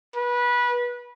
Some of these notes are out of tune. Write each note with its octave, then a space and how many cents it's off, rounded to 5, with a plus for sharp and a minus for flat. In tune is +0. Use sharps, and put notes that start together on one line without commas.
B4 -20